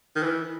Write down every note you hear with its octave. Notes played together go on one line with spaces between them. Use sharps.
D#3
E3